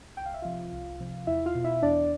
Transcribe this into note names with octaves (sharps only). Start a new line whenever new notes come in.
C2 G5
F5
E5
C3 F3 F4 F5
C2
C3 F3
E2 E4 E5
F4 F5
B2
E4 E5
E2 D4 D5